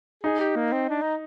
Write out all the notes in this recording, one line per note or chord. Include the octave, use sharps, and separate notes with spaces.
D#4 G#4
G4
A#3
C4
D4
D#4